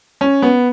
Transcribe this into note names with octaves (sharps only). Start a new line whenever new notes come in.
C#4
B3